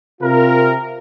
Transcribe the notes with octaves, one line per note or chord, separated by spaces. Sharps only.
C3 F4 A#4